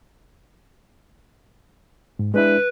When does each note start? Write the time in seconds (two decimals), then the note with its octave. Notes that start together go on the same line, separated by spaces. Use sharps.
2.19 G#2
2.34 G#3 D4 E4 B4